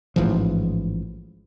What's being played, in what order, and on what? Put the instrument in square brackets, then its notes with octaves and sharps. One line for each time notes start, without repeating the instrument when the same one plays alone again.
[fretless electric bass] A1 G#2 E3 F3